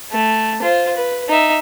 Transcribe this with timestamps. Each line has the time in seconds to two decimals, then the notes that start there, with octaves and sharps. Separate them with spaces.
0.12 A3
0.62 F4 C5
0.96 B4
1.29 D#4 E5